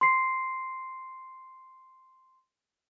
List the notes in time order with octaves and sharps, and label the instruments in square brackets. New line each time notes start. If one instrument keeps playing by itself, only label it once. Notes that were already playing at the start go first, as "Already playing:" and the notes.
[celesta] C6 C7